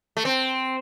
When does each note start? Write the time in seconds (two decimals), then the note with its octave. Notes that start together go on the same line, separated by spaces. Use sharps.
0.17 A3
0.25 C4